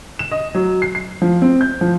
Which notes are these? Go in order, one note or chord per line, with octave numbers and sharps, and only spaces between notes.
E7
D#5
F#3
C7
C7
F3
C4
G6
F3